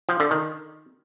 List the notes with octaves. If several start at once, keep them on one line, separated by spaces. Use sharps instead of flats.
F3
D3
D#3